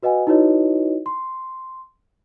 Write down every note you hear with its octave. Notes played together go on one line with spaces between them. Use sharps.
F#4 B4 D#5 F#5 G#5
D#4 E4 F#4 B4 C#5 D#5
C6